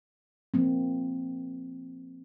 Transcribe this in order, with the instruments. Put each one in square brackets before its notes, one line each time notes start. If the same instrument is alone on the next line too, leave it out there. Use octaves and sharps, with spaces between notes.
[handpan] F3 A#3 C4